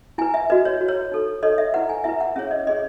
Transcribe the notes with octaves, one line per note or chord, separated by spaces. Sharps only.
E4 B4 G#5
E5
F#4 B4 D#5
C#5
F#4 B4
C#5
D#4 A4 C#5
D#4 A4 C#5 D#5
E5
E4 B4 F#5
G#5
E4 B4 E5
F#5
C#4 G#4 C#5 E5
D#5
C#4 G#4 C#5 D#5